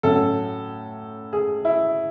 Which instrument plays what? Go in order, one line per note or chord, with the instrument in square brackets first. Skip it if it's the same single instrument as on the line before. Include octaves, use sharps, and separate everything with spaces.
[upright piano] A2 F#3 C#4 A4
G#4
E4